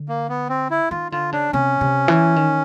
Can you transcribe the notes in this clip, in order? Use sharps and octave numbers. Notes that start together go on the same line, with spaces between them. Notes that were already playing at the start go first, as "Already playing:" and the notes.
Already playing: D3
A#3
B3
C4
E4
D#3 F4
D3 F4
C#3 D4
C3 C#4
C3
E3
D#3